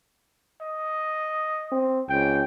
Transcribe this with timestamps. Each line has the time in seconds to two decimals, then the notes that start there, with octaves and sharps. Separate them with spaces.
0.62 D#5
1.72 C4
2.09 C#2 G5